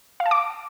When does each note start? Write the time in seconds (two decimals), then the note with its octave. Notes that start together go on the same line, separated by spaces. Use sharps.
0.20 F5
0.26 A5
0.31 D6